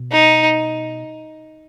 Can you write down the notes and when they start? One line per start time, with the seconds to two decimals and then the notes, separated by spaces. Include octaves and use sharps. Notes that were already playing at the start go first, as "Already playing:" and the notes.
Already playing: B2
0.11 D#4